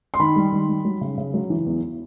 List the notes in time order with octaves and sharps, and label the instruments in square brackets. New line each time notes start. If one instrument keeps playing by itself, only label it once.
[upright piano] C6
D#3 B5
G3
D#3
G3
F#3
C#3
C#3
F#3
E3
E2